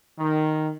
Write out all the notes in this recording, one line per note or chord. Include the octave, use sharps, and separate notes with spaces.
D#3